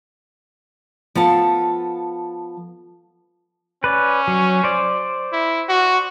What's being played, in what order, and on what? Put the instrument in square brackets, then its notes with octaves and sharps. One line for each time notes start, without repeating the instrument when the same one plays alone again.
[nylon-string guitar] F3 B3 A4 A5
[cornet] C#4 [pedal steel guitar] B4 D5
[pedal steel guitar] F#3
C5 D5
[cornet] E4
F#4